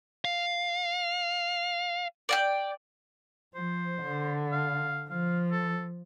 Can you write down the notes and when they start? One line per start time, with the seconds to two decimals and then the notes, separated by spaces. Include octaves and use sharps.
0.25 F5
2.29 D5 F#5 G5
3.55 F3 C5
4.03 D3
4.52 F5
5.10 F3 F5
5.51 A4